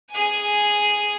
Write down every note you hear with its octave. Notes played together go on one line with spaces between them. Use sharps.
G#4 G#5